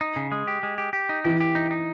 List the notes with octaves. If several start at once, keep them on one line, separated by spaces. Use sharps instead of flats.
D#4
C#3
G#3
G4
G#3
G4
G4
D#4
E3 G4
G4
D#4
D#4